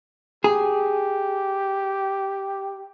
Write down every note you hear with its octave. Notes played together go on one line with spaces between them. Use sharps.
G4 G#4